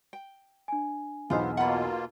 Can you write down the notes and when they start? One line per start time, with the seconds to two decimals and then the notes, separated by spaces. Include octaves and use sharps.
0.13 G5
0.68 D4 G#5
1.30 B1 E2 B3 F4 C5
1.57 B2 A#3 F4 F#5 B5